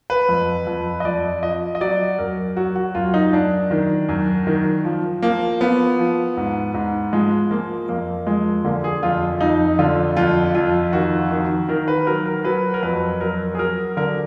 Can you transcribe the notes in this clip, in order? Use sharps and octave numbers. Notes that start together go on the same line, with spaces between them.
B4
F2
F2
D#5
F2 D5
F3 D#5
D#5
F#3 D5
F#2 A#4
F#3 F#4
F#4
F#2 F4
D#4
F#2 D4
D#3
F#2
D#3
F3
F3 A#3
F3 B3
F3
G#2
G#2
F3 G#3
F3 A#3
F2 A#3
F3 G#3
D3 A#3
G#4
F2 F4
F2 D#4
D3 F4
F2 F4
F2 F4
D#3 F#4
D#3
D#3 A#4
B4
F#3 A#4
A#4
F#3 B4
A#4
F2 B4
F#3 A#4
G#4
F#3 A#4
D3 A#4